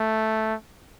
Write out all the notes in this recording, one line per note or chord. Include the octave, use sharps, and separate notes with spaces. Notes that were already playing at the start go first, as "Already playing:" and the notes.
Already playing: A3